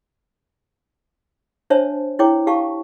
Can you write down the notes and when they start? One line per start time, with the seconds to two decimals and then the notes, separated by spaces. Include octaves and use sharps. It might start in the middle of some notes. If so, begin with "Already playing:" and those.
1.70 D4 C5 C#5 E5 A5
2.19 E4 C#5 G5 D6
2.47 G4 F5 A5 C#6